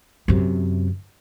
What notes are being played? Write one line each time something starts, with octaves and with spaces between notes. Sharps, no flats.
F#2 C3